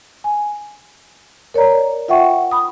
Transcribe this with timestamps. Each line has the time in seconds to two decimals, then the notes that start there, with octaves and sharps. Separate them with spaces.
0.24 G#5
1.54 A#4 C#5 D5 A#5
2.08 F4 E5 F#5 G5 C#6
2.51 B5 D#6